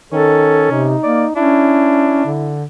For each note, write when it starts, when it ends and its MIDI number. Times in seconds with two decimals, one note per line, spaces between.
0.13 0.70 51
0.13 0.88 61
0.13 0.70 69
0.71 0.96 48
0.71 1.34 63
1.03 1.26 58
1.03 1.25 74
1.36 2.23 61
1.36 2.32 62
1.36 2.57 64
2.25 2.65 50